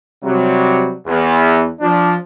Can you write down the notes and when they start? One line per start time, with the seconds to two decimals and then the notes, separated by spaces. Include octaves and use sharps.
0.23 C3 F#3 G3
1.06 E2
1.80 F3 D4